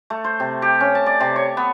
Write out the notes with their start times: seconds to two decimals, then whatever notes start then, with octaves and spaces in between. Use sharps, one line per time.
0.10 A3
0.24 C5
0.40 C3
0.62 G4
0.80 C#4
0.95 A5
1.06 D5
1.20 C3
1.36 C#5
1.57 B3